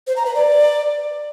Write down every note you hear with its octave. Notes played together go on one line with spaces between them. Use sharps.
C5
A#5
B4
D5